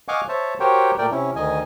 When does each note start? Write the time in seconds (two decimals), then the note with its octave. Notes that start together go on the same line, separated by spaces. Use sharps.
0.08 D#5 F5 F#5 G#5 C#6 D6
0.29 C5 C#5 E5 A5
0.60 F#4 G4 A#4 C5 C#5 G5
0.98 A#2 A3 A#4 D5 G5
1.11 C3 C#4 E4
1.36 D2 D#3 D#5 G#5